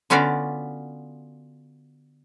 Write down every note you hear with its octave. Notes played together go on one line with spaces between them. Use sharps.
D3 B3 C#4 F4 F#4 D5